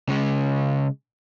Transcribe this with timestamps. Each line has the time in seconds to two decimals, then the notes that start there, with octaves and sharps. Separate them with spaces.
0.09 C#3 G#3